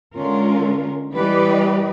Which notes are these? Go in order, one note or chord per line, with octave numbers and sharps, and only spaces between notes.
D3 G#3 C#4 F4 A#4
E3 G3 G4 B4 D5 D#5